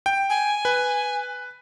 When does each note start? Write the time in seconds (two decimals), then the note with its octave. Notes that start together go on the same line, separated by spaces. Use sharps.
0.06 G5
0.30 G#5
0.65 B4